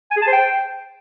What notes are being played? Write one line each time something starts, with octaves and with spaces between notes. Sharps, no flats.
G#5
G#4
A5
C5
G5